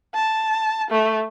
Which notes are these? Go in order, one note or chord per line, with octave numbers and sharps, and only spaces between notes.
A5
A3